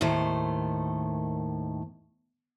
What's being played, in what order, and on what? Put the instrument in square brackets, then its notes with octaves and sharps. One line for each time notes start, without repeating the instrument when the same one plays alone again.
[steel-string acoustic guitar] D#2 A2 D#3 A3 C5